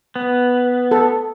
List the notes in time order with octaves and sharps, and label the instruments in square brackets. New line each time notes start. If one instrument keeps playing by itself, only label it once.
[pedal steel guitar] B3
[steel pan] A4